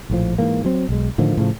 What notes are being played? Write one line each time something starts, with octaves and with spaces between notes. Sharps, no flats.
A#1 A2 F3
G#2 E3 A#3
F#3 C4
B1 G#3
A2 D3 D#3 F3
A2 C#3 F3